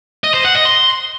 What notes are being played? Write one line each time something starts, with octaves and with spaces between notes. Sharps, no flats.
D#5
C5
F#5
D#5
C6